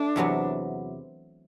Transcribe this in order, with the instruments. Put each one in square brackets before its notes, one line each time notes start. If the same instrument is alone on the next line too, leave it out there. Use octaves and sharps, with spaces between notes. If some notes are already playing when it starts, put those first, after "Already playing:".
Already playing: [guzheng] A3 [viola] D4
[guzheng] E2 C3 F#3 B3